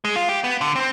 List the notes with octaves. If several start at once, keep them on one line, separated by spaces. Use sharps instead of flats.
G#3
F4
G4
B3
D3
C4